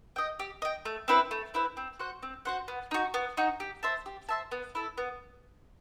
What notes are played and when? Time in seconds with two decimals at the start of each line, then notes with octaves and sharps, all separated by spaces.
0.16 D#5 G5
0.39 G4
0.62 D#5 G5
0.85 A3
1.08 C4 E4 B4
1.31 A3
1.54 C4 E4 B4
1.77 C4
1.99 F#4 C5 F#5
2.23 C4
2.45 F#4 C5 F#5
2.68 B3
2.91 D#4 F#4
3.14 B3
3.37 D#4 F#4
3.60 G4
3.83 C5 E5 A5
4.06 G4
4.29 C5 E5 A5
4.52 B3
4.75 E4 A4
4.98 B3